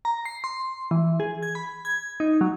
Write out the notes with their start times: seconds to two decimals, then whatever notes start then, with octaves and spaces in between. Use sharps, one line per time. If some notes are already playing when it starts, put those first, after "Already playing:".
0.05 A#5
0.25 C7
0.44 C6
0.91 E3
1.20 G#4
1.43 G#6
1.55 B5
1.85 G#6
2.20 D#4
2.41 F#3